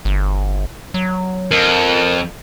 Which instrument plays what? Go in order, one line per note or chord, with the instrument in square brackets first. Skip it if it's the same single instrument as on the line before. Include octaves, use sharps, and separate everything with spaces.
[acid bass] G1
F#3
[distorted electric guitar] F2 [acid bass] A#4